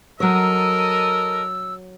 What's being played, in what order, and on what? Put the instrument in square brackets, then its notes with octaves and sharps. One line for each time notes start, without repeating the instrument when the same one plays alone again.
[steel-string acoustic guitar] F#3 C#5 [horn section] A4 A#4 D#5 [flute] E6